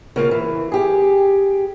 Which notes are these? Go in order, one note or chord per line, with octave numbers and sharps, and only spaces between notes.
C#3 A#3 F4
E3
G4 G#4